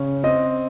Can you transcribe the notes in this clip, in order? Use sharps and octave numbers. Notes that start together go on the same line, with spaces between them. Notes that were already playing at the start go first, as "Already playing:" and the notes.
Already playing: C#3 C#4
C4 D#5